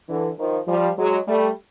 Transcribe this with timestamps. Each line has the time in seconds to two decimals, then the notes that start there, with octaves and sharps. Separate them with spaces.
0.08 D3 E3
0.38 D#3 F3
0.67 F3 G3
0.97 F#3 G#3
1.27 G3 A3